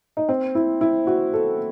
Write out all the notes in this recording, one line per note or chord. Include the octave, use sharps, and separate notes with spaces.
D#4
C4
E4
E4
F#4
A4